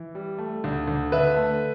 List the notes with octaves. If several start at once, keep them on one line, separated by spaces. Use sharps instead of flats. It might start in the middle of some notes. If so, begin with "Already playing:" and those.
Already playing: E3
G3
A3
D2
D2
D3 B4 E5
A3